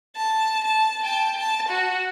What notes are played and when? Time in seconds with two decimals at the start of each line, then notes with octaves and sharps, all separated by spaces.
0.16 A5
0.65 A5
1.02 G5 A5
1.38 A5
1.69 F#4